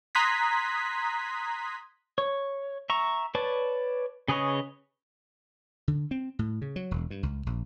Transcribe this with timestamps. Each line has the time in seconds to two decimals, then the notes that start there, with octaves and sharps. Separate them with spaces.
0.15 A#5 C6 D#6 F#6 G#6 B6
2.18 C#5
2.90 E5 A#5 C#6
3.35 B4 C#5 D5 A5
4.28 C#3 G#4 B4 C#5 D#5
5.88 D3
6.11 C4
6.39 A2
6.62 C#3
6.76 F#3
6.91 E1
7.10 G2
7.23 C#2
7.46 A#1